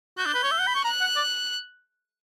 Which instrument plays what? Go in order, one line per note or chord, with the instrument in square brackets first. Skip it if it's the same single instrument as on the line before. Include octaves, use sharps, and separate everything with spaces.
[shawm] F#4 [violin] G6
[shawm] D4
B4
C#5
E5
F#5
B5
C#6
[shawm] A#5 [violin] F#6
[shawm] F#5
D5